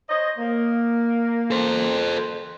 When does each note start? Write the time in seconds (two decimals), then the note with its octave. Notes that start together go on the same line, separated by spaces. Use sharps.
0.10 C5 C#5 D#5
0.39 A#3
1.51 A4 C5